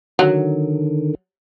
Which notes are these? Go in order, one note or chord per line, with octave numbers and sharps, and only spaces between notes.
D3 D#3 F#3